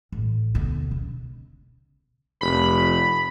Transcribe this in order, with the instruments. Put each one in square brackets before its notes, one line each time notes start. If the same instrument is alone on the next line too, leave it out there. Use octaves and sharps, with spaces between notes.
[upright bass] A1
D2 B2
C#3
[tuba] F1 [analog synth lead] B5